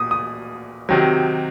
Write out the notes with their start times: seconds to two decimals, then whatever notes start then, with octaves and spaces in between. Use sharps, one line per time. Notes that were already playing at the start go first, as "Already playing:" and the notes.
Already playing: A#2 D#6
0.11 D#6
0.89 C3 D#3 F#3